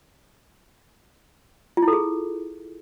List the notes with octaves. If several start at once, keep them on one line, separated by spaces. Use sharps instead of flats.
F4
E4
A4
G#4